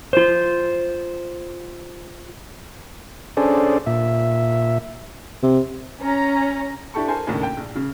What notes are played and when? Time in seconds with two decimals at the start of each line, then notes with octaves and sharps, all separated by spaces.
0.13 F4 C5
3.37 C#4 D4 G#4 A4 C5 D5
3.86 A#2 E5
5.43 C3
6.01 C#4 A#5
6.94 D4 E4 G4 A4 C#6
7.08 A4 A#4 C5 G#5
7.27 D#2 A2 C#3 A#3 C#4 D4
7.43 G5
7.57 A#1
7.75 C#3